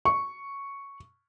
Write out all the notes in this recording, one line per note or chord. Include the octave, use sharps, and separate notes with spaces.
C#6